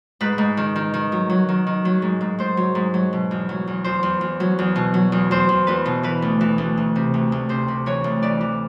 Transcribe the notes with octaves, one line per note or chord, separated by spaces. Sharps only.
G#2 B4
G#2
D#3
D#3
D#3
F#3
F#3
D#3
D#3
F#3
G#2
G#2
G#2 C5
F#3
G#2
F#3
B2
E2
F#3
E2
E2 C5
E2
E2
F#3
E2
B2
F#3
E2
E2 C5
E2
E2 B4
B2
E3 B4
D2
E3
D2
D2
C3
D2
D2
C3 C5
C3
E3 C#5
D2
E3 D5
E3